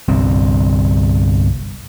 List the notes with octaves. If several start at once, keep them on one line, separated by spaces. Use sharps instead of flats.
G1 C2 G3 C4